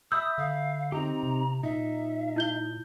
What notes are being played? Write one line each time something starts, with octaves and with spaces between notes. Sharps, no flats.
E5 B5 D#6 E6 G6
D3 F5
C4 D#4 G4 A#5
C3
A#2 D#4 E5
E4 G6 G7